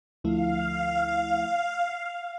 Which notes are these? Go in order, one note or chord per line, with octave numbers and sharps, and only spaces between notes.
D2 D3 F3 A3 E4 F5